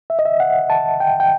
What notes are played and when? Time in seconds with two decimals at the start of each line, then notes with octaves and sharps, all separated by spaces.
0.10 E5
0.19 D#5
0.25 E5
0.40 F#5
0.70 A5
1.00 G5
1.20 G5